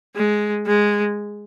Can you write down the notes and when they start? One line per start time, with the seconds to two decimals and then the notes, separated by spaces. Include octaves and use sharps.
0.16 G#3
0.66 G#3